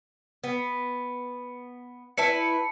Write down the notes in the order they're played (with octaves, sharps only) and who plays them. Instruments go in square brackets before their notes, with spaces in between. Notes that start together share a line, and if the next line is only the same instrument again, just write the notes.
[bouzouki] B3
[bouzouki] E4 B4 E5 [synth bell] A5 C#7